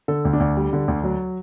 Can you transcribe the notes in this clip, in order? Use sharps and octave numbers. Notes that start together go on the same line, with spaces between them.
D3 A4
D2
D4
D2
G3
D3
D2
F#3